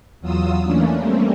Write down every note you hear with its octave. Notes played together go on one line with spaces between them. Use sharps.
E2 F#3 F4 D#6 E6
E3 A3 A#3 C#4 D4
G3 A3 A#3 C4 C#4